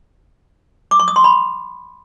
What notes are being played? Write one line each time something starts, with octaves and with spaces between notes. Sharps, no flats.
D6
C#6
D#6
C6
B5